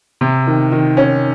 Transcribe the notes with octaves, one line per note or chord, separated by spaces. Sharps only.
C3
D#3
D#3
C#4